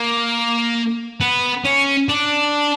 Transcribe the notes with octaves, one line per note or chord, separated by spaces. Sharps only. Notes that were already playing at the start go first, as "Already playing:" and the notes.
Already playing: A#3
B3
C#4
D4